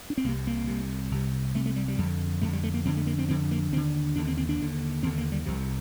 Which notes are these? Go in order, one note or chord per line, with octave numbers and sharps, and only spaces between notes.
D4
C4
C2 C3 A#3
A#3
C2 C3
C2 C3
C2 C3 A3
A3
G3
G3
F2 D3
F2 D3 A3
G3
A3
A#3
F2 D3 C4
A3
A#3
C4
F2 D3 C4
A#3
D#2 D3 C4
D#2 D3 D4
C4
C4
D4
D#2 D3
D#2 D3 C4
A#3
G3
C2 C3 F3